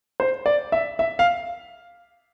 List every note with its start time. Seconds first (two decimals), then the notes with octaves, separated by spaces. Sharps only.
0.20 C5
0.46 D5
0.72 E5
0.99 E5
1.19 F5